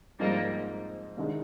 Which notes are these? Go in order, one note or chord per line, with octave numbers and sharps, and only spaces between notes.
G#2 F3 G3 G#3 A#3 C4 D#4
C2 C3 D#3 G#3 D4